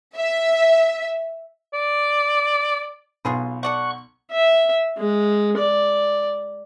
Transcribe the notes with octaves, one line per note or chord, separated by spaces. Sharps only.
E5
D5
B1 F4 G#4 B4
A4 D5 F#5 C#6 F#6
E5
G#3
D5